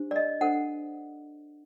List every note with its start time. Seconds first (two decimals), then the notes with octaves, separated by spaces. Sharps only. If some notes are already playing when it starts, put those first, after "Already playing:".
Already playing: D4 G4 C5
0.11 D5
0.16 D#5
0.41 D4 A4 C5 F#5